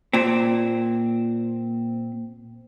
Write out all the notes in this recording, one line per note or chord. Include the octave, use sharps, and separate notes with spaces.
A#2 C4